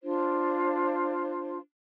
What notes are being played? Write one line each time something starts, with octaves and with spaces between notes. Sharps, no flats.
D4 F4 C5